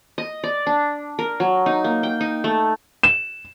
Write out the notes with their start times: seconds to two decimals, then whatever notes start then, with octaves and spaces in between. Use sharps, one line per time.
0.18 D#5
0.44 D5
0.67 D4
1.19 A#4
1.40 F#3
1.66 D#4
1.84 A#3
2.03 G5
2.21 D#4
2.44 A3
3.03 E7